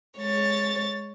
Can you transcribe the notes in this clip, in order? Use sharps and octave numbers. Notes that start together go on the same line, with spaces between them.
G#3 C#5 A6